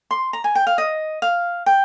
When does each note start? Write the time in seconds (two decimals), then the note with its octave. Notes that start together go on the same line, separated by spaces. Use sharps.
0.11 C6
0.33 A#5
0.44 G#5
0.55 G5
0.67 F5
0.78 D#5
1.22 F5
1.66 G5